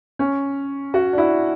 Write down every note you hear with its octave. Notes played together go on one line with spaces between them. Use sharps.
C#4
F#4
D4
E4